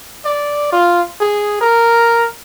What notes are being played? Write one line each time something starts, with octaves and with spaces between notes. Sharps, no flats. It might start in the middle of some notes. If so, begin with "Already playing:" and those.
D5
F4
G#4
A#4